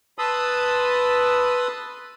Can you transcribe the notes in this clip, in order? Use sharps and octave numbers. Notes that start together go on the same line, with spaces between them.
B4 A5 B5 C6 D#6 E6